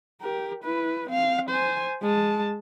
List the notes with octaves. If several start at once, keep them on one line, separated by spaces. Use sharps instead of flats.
G4 A#4
E4 B4
C4 F5
C5 G#5
G#3 A5